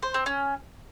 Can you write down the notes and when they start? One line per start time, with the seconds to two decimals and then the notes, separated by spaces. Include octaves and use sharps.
0.02 C5
0.14 C4
0.26 C#4